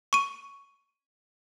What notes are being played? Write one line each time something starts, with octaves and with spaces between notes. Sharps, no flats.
C#6 D#7